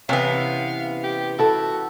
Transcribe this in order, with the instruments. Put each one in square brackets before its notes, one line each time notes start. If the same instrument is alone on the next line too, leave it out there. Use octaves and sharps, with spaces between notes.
[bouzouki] C3 B3 [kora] E3 C#4 [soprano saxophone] F5
[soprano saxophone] G4
[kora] E4 A4 E5 [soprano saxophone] F#4